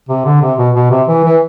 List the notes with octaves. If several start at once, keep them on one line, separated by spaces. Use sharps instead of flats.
C3
D3
C3
B2
B2
C3
E3
E3